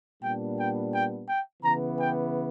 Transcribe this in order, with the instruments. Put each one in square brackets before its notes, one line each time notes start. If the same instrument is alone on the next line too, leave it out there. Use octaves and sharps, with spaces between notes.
[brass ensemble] A#2 G3 B3 D4 G5
G5
G5
G5
C#3 E3 B3 A#5
G5